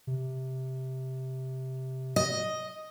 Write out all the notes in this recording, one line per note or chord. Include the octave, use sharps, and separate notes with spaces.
C3
D#5